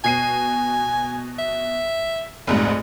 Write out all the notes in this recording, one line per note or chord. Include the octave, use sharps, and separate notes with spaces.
B2 G#5 C7 D#7
E5
F1 A#1 G#2